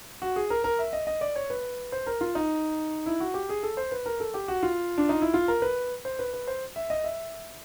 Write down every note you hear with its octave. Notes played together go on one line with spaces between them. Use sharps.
F#4
G#4
A#4
A#4
E5
D#5
D#5
D5
C#5
B4
C5
A#4
F4
D#4
E4
F#4
G4
G#4
A4
C5
B4
A#4
A4
G4
F#4
F4
D4
D#4
E4
F4
A#4
B4
C5
B4
B4
C5
E5
D#5
E5